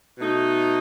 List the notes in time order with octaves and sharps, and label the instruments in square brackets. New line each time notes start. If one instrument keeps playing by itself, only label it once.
[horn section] B2 A3 D#4